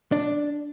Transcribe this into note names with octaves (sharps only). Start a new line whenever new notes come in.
D4